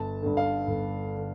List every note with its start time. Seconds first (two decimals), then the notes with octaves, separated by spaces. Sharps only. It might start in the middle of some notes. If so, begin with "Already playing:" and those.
Already playing: G1 A5
0.22 G2 D3
0.37 F5
0.67 G1
1.16 D3